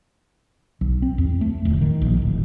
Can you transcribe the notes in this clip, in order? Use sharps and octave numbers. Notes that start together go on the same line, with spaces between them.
B1
C4
E2
A3
D1
D#3
A#1
D1